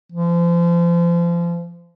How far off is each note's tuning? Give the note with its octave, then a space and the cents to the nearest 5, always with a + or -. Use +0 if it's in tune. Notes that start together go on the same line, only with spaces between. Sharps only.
F3 -35